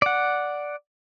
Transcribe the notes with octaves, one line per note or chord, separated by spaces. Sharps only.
D5 F#5